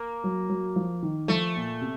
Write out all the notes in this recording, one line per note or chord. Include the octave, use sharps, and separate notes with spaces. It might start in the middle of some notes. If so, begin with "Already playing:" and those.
Already playing: A#3
F#3
F#3
F3
D#3
F3 A3
A#2
C3